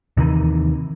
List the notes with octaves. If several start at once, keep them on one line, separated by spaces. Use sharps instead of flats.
D#2 C3 D#3 E3